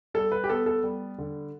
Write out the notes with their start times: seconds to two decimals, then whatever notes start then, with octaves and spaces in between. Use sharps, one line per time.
0.14 G3 A4
0.32 B4
0.44 G4
0.49 B3 A4
0.66 A4
0.83 G3
1.18 D3